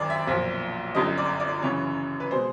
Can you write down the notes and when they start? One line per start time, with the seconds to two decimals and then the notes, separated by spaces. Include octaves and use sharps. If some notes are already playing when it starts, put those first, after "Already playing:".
Already playing: G#1 F#2 D#3 D5
0.10 E5
0.27 B1 A#2 F3
0.95 G1 F#2 D3 D#5
1.18 D5
1.40 D5
1.62 F#2 C#3 E3 C#5
2.20 B4
2.31 B2 G#3 C5